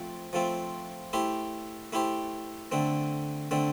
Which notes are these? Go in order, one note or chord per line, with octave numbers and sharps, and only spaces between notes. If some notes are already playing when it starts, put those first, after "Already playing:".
Already playing: F3 A3 C4 F4
F3 A3 C4 F4
A3 E4 G4 C5
A3 E4 G4 C5
D3 A3 C4
D3 A3 C4